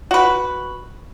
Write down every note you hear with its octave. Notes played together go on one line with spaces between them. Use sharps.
F#4 B4